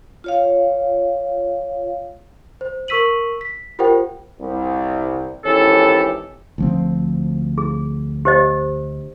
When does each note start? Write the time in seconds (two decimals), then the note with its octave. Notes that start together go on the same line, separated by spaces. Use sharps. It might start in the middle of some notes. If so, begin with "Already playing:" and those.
0.24 F4 C#5 F5
2.61 C5
2.88 A#4 C#6 E6 B6 D#7 F#7
3.41 B6
3.79 F4 G4 A#4 C5 F#5 G5
4.40 C2
5.45 G#1 E3 C#4 E4 G4 A4
6.58 D2 F3 C4
7.58 G#4
8.25 G4 C5 D#5